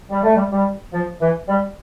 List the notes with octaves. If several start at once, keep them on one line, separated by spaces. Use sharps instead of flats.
G3
A3
G3
G3
F3
E3
G3